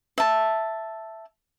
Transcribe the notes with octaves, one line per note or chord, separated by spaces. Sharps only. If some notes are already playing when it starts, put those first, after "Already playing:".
E5 A5